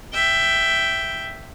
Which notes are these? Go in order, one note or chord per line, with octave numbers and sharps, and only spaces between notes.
E5 G5